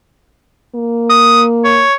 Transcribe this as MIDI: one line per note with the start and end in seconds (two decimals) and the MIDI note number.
0.75 1.84 58
1.10 1.43 87
1.64 1.94 73